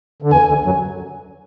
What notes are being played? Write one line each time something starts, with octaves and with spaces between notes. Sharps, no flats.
D3
E2 E3 G#5
D2 D3
F#2 F#3